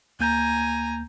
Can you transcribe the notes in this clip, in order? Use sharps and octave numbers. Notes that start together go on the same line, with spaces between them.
D2 A#3 G#5 A#5 G6